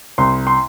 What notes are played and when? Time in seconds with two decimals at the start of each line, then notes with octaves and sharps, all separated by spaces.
0.18 C2 C6
0.47 C6